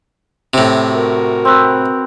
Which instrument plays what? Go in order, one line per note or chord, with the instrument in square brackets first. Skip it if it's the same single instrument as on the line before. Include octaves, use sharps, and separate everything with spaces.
[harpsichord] A2 C3
[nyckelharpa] F#4 A#4
[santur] C4 B4